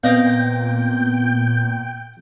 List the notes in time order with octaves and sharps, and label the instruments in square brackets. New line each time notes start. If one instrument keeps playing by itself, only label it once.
[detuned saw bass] A#2 [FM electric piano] B3 C4 [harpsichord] D#5 F5 [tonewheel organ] G5